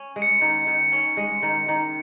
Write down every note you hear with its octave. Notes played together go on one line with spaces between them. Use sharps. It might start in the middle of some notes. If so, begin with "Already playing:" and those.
Already playing: C#4
G#3
C#7
D#3
D#3
C#4
G#3
D#3
D#3